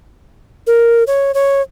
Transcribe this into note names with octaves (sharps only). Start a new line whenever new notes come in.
A#4
C#5
C#5